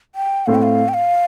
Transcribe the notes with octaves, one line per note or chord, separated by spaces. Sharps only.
G5
A2 A3 C4 F5
G5
F5
G5
F5